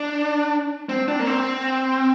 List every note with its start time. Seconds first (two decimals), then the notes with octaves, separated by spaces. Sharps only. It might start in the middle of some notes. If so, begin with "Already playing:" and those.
Already playing: D4
0.89 C4
1.08 D4
1.20 A#3
1.27 C4